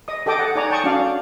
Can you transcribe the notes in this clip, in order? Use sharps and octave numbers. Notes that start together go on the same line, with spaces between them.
D#5 D#6
G4 A4 D#5 G5 D6 D#6
F#5 A5
D#4 C#5 D5 G#5 A#5
G5 A5 C#6 D#6
C#4 D4 F#4 D5 F5